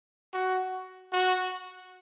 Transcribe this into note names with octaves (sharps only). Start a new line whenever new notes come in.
F#4
F#4